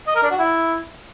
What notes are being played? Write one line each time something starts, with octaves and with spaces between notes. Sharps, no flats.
D#5
A#4
D4
F#4
E4